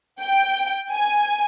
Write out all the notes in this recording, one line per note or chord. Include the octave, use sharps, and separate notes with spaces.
G5
G#5